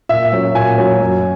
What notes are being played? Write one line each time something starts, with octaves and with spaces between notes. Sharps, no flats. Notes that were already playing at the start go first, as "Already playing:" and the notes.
A#2 E5
F#3 C#4
A#2 G#5
F#3 C#4
F#2